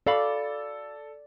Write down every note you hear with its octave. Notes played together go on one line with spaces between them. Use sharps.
F#4 A4 D5 F5 B5